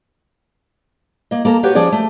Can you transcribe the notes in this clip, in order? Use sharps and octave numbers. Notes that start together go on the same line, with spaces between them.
A#3 D#5
A#3 A4 A#5
F#4 G4 B4 C#5 F#5 G5
F3 C#4 G#4 D5 G5
A3